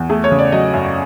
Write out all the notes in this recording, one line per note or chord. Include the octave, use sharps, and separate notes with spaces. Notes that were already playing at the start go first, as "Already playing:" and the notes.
Already playing: E2
A3 G#4
C#5
C#3
D5
F#3 D#5
F#2